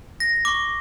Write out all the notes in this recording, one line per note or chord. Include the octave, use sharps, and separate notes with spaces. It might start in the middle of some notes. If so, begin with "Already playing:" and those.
A#6
C#6 D6